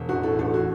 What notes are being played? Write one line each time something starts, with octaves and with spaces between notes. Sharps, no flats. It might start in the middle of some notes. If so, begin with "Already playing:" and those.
Already playing: E1
A1 F#4
A2 A4
A1 A4
F#4